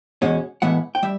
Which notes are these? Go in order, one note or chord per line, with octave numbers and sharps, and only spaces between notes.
E2 B2 G#3 C#4
A2 E3 G#3 B3 E5 F#5
G5
G3 E5